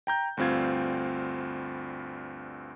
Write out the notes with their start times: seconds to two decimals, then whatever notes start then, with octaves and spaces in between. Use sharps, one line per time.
0.07 G5 A#5 G6
0.37 D2 G2 C4 F4 G#6